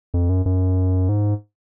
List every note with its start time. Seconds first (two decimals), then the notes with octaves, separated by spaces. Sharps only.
0.14 F2
0.29 F#2
0.46 F#2
1.09 G#2